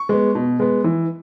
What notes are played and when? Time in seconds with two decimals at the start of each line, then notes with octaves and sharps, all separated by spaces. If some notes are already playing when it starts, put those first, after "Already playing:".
Already playing: C#6
0.09 G#3 B3
0.35 B2
0.60 G#3 B3
0.84 E3